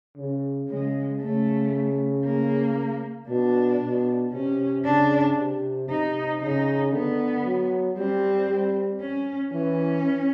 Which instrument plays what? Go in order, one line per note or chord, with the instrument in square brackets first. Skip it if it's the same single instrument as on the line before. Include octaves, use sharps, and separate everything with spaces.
[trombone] C#3
[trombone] C#3 [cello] G#3
[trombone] C#3 [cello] A3
[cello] A#3
[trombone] B2 [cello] D4
[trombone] B2
[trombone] C3 [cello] C#4
[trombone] C#3 [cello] D4
[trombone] C3
[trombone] C3 [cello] D#4
[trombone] C#3 [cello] D#4
[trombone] D3 [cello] B3
[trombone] F#3
[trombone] G3 [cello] C4
[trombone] G3
[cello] C#4
[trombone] E3 [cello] C#4